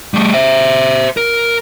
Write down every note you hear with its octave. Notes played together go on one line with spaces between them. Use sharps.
G3 A3
C5 E5
A#4